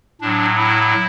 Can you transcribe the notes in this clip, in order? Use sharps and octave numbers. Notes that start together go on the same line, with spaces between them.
A2 F#3 D4
E4